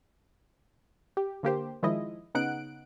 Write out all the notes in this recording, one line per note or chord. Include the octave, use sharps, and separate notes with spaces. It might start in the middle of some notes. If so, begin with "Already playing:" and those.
G4
D3 A#3 G4 C5
D#3 F3 G#3 E4 D#5
C#3 B3 D#4 F#5 F#6 D7